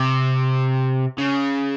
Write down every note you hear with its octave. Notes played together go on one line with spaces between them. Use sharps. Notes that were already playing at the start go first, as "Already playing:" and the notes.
Already playing: C3
C#3